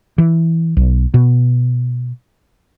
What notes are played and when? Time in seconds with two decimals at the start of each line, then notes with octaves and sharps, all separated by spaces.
0.18 E3
0.77 B1
1.14 B2